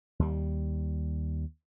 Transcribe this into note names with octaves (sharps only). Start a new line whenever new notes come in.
D#2 G3